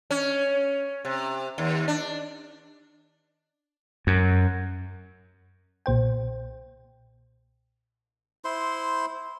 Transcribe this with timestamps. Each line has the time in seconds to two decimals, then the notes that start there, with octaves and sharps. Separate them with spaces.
0.11 C#4
1.05 C3
1.58 D#2
1.88 D4
4.07 F#2
5.86 B1 A#2 C5 G5
8.45 E4 C5 C6